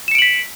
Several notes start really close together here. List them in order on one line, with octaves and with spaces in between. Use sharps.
E7 C#7 D7 F#7 B6